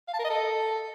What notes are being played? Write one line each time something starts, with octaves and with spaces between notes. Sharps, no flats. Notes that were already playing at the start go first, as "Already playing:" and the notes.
F5
A5
A#4
D#5
A4